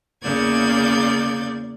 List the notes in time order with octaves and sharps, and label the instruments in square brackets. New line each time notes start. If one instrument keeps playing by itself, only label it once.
[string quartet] E2 C#3 A#3 D5 G6 G#6